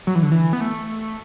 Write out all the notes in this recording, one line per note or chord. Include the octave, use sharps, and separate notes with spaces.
F#3
E3
D3
E3
B3
A3